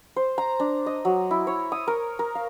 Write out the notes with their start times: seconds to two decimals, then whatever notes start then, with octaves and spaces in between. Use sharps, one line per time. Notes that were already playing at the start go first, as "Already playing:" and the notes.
0.16 C5
0.38 A#5
0.60 D4
0.86 D#5
1.05 F#3
1.31 E4
1.47 C#5
1.72 D#6
1.87 A#4
2.19 A#4
2.35 F5